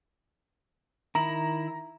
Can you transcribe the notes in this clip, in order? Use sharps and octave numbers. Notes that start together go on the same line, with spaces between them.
D#3 E4 A#5 B5